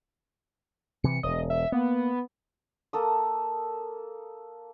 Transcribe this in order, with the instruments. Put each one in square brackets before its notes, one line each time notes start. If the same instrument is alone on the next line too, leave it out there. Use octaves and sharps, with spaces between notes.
[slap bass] C3 E3 [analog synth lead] C#7
[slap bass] E1 [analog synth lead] D#5
[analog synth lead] E5
[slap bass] A#3 [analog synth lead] B3
[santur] A#3 A4 D#6